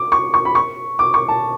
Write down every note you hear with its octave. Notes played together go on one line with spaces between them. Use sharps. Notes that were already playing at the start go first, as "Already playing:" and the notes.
Already playing: D6
C#6
C#6
B5
C#6
D6
C#6
A5